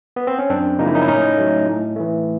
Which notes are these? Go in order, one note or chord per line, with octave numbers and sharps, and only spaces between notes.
B3
C4
C#4
F#2 C4 D4
C#3 F3 A#3 D#4
E4
C#4 D#4
E4
A2 C#4 D#4
F#3 A3
A2
E3 A3